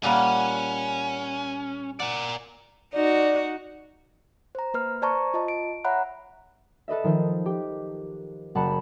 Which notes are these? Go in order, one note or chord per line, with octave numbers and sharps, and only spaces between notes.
A#2 G3 A#3 C#4 F#5
A#4 D5 F#5
D#4 F#4 D5
C5 A#5
A#3 B4 F6
C5 D5 A5 A#5 C#6
F4 D#5 A5
D7
C#5 E5 F#5 A#5 B5 F#6
A4 B4 D#5 E5
D#3 F3 C5 D#5
G4
F#1 F#5 A5 B5